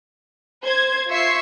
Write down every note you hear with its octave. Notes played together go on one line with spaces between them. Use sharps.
C5 G#6
F4 E5 C#6 G#6 C7